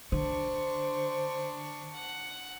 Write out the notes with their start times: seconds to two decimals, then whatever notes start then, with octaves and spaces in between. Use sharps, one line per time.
0.12 D3 D4 C5 C#6
1.93 F#5